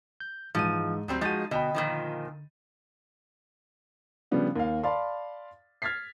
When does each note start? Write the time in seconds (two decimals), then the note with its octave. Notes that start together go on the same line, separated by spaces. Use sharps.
0.20 G6
0.55 G#2 E3 F3 G#3 E6 D#7
1.08 D2 F#3 G3 C4
1.21 F3 G#3 D#4 F#4 G#4 A6 D#7
1.51 B2 D3 D#5 G5 B5
1.75 A#2 D#3 F3
4.31 C#3 F3 G3 B3 D4
4.56 D#2 F5
4.83 D5 F5 A5 B5 C6
5.82 F6 G#6 A6 B6 C7